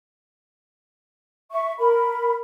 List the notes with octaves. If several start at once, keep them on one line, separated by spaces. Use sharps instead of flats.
E5 C#6
A#4 B5